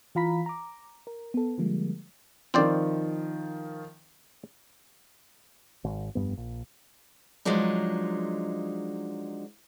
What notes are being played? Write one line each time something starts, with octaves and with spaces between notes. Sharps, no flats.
E3 F4 F5 A#5 B5 B6
A#5 D6
A#4
B3 A4
D3 F3 G3 G#3 A#3
D#3 F3 C4 C5 D5
G#1
F1 G2 B3
A#1
F3 F#3 G#3 D4 D#4